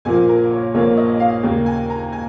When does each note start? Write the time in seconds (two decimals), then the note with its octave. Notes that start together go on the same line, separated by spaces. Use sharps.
0.05 A#1 A#2 F3 A#3 G#5
0.29 A#4
0.51 C#5
0.74 A#1 A#2 F3 A#3 C#5
0.97 D#5
1.20 F5
1.43 D#2 C#3 A#3
1.66 G#5
1.90 A#5
2.12 G#5